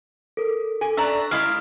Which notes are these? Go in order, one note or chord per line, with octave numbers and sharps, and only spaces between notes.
A4 A#4
A4 G#5
D4 D5 E5 A5 A#5 C#6 E6 F#6
G3 G#3 E4 F5